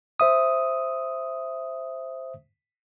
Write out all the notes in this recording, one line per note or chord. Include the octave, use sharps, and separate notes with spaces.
C5 E5 D#6